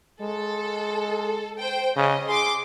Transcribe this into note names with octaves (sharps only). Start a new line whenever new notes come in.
G#3 A4
C5 G5
C#3 D#5
G#4 C6 D6